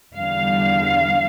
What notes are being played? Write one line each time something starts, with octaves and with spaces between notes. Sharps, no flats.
E2 D3 G3 F5